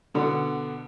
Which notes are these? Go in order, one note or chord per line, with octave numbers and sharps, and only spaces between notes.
B2 D3 B3